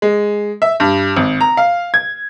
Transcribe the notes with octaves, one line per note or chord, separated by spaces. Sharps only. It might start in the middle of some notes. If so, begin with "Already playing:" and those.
G#3
E5
G2
G#1
A#5
F5
G#6